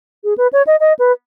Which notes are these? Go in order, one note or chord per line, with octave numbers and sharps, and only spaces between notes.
G#4
B4
C#5
D#5
D#5
B4